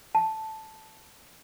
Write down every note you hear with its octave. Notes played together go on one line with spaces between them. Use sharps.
A5